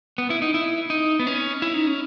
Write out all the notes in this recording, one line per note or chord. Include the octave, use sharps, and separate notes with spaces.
B3
E4
D#4
E4
D#4
B3
C#4
E4
D#4
C#4